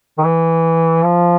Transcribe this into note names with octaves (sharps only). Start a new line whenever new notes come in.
D#3
E3
F3